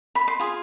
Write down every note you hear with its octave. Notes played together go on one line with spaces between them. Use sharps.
B5
C6
F4 G#4